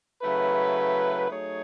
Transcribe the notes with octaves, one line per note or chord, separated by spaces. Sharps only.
C#3 F#3 A3 E4 B4
F#3 A3 D#4 G#4 C#5